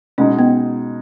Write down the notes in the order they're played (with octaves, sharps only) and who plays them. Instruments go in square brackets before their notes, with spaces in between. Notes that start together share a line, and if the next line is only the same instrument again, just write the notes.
[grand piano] B2 G#3 D#4 [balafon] C#4
[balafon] B3